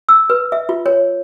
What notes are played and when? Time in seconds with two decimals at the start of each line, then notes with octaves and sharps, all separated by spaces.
0.09 E6
0.30 B4
0.52 E5
0.69 F4
0.86 C#5